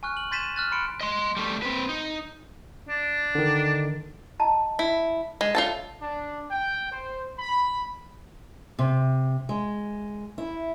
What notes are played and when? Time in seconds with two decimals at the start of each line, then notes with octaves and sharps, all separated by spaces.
0.03 G#5 C#6 F6 F#6
0.17 F#7
0.31 C6 G6 A6 B6 D#7 E7
0.43 D#7
0.56 F6 F#6 A6
0.72 B5 C6 C#7 D7
1.01 D#5 C6
1.37 G3 A3
1.62 C4 B4
1.89 D#4
2.89 D4
3.35 D3 D#3
4.40 D#5 A5 A#5
4.79 E4
5.41 G#3
5.55 F4 A4 C#5 E5 A5
6.01 D4
6.51 G5
6.91 C5
7.38 B5
8.79 C3
9.49 G#3
10.38 E4